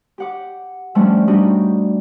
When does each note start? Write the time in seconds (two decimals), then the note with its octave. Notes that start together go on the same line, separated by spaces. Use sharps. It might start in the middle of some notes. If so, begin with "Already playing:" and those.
0.18 G4 F#5 D6
0.95 F3 G3 A3 C#4 D4 G4
1.27 G3 D4 D#4 F#4 G4